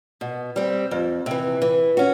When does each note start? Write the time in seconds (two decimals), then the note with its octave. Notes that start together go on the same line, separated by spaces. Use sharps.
0.21 B2
0.56 G3 C4
0.91 F2
1.26 C3 E3
1.62 E3
1.97 C#4 F#4